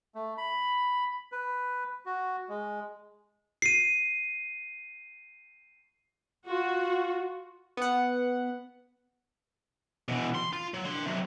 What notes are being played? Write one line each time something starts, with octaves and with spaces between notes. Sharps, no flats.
A3
B5
B4
F#4
G#3
C7 D#7
F4 F#4
B3 F#5
B2 E3
C6
F4
F#3
D4 C6
C3 F#3